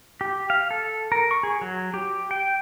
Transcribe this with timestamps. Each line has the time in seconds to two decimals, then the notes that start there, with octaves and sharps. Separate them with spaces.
0.21 G4
0.50 F5
0.71 A4
1.12 A#4
1.31 C#6
1.43 G#4
1.61 F#3
1.94 G4
2.31 G5